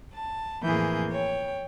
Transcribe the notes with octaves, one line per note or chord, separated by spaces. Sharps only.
A5
F2 A2 E3 A#3 G#4 G6
C#5 G5